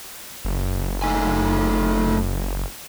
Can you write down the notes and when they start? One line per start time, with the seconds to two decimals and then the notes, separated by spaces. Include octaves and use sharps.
0.45 F#1
1.02 A3 D#4 G#5